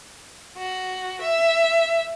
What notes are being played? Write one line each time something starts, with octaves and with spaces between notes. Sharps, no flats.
F#4
E5